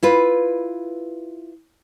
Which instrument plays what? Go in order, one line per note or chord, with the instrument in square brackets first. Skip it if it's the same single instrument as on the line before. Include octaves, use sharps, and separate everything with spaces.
[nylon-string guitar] E4 F4 B4